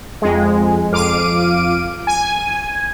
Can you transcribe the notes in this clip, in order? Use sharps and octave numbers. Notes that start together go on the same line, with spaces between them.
F2 G#3
F2 F5 D6 D7 D#7
G#5